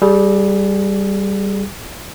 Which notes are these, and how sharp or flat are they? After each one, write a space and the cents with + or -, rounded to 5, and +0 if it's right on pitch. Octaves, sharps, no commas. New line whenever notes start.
G3 +0 G#4 +30